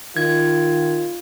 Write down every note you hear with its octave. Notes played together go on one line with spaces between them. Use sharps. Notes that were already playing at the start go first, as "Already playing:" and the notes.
D#3 F4 G#6